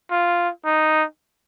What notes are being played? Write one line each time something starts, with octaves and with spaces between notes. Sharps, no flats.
F4
D#4